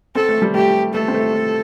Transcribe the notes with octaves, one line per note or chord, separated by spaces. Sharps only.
C4 A4
A3
G3
A3 G4
A3 A4
C4
A3
A3